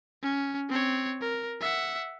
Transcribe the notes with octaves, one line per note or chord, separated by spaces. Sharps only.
C#4
C4 C#5
A#4
E5 F#5